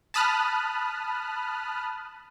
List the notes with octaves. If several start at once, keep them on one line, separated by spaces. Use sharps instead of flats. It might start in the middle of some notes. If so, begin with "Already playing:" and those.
A5 B5 D#6 F6 F#6